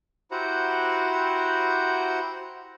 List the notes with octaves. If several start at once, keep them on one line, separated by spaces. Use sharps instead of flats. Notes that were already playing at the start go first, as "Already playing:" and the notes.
E4 F#4 G4 C5 F#5 A#5